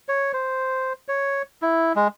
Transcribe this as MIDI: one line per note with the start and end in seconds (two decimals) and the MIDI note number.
0.09 0.32 73
0.33 0.93 72
1.08 1.42 73
1.62 1.93 64
1.96 2.08 56